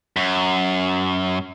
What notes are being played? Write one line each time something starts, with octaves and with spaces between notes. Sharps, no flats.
F#2